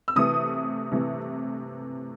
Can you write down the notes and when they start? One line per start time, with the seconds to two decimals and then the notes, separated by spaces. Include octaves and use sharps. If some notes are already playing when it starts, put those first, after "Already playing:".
0.08 E6
0.16 C3 E3 A3 D#6
0.91 C3 E3 A3